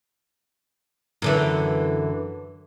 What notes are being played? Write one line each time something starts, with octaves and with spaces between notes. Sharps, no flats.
F#2 D3 E3